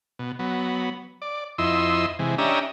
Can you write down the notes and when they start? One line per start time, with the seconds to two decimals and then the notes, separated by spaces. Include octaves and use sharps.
0.19 B2
0.39 F#3 B3
1.22 D5
1.58 F2 E4 D#5 C6 E6
2.19 C3 E3 G#3
2.38 C#4 D4 G4 D#5 E5 A#5